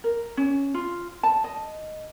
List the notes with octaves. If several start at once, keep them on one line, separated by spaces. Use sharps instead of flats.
A#4
C#4
F4
A5
D#5